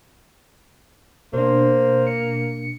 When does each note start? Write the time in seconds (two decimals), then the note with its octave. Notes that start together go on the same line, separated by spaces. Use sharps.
1.33 B2 A#3 D4 C5
2.07 C#7